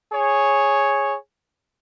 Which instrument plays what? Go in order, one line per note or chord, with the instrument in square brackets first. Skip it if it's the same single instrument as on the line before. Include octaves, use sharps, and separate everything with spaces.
[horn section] G#4 C#5